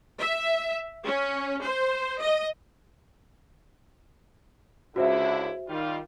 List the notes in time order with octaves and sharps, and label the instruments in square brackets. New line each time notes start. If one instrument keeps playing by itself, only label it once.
[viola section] E5
C#4
C5
D#5
[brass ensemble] C#2 D3 E4 [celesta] F#4 C5 E5
[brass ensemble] D#3 G3 F4